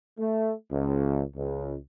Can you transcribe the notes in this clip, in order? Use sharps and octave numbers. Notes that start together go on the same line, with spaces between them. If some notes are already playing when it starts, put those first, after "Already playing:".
A3
C#2
C#2